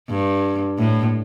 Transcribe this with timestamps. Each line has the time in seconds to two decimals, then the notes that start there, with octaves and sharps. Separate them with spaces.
0.09 G2
0.79 A2